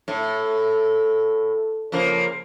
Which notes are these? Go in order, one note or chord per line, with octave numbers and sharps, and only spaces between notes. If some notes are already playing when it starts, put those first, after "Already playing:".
A2
C#3 F3 A#3